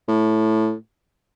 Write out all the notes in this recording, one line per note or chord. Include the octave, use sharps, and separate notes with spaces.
A2